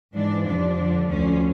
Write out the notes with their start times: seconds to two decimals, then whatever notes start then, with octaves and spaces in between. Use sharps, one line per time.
0.14 G#2 E3 D4
0.45 F2 C3 F3 D4
0.78 F2 D3 F3
1.09 D2 D3 F3 C#4